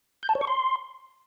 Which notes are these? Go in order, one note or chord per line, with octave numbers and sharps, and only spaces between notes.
G6
A5
C#5
C#6
C6